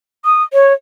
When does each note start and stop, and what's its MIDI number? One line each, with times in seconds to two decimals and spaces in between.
0.25 0.43 87
0.53 0.73 73